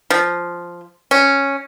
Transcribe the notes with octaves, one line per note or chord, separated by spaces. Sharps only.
F3
C#4